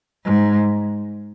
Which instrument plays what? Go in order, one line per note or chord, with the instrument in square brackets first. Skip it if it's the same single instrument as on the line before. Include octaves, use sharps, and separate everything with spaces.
[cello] G#2